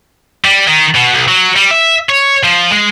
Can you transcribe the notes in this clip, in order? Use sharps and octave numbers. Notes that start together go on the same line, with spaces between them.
G3
D#3
B2
B1
F#3
G3
E5
C#5
F3
G#3